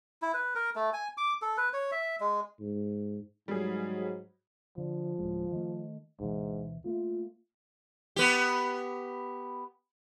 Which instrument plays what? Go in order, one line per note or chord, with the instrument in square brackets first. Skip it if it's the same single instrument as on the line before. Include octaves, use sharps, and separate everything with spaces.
[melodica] E4
B4
A#4
A3
G#5
D6
A4
B4
C#5
E5
G#3
[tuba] G#2
[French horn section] G#2 F#3 [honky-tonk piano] G3 G#4
[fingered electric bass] D3 [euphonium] F3
[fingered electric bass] D1 D#2 G#3
D#3 A3
[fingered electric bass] D2 B2 E3 [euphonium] G#2
[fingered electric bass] A3 A#3 [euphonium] F4
[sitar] B3 G4